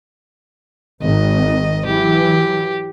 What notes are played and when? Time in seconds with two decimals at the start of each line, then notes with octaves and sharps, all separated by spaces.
1.02 G#1 D#3 D#5
1.85 E3 F#3 G4